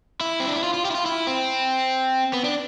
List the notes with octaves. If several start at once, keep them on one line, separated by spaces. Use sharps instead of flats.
E4
C4
D4
E4
F4
F4
G4
E4
F4
E4
C4
B3
D4